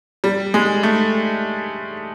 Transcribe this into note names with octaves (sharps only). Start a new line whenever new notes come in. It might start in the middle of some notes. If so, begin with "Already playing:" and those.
G3
G#3
A3